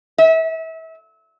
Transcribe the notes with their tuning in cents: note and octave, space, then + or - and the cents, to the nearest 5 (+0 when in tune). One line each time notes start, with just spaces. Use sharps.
E5 -30